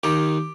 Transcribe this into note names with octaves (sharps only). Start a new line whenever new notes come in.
D#2 D#3 G4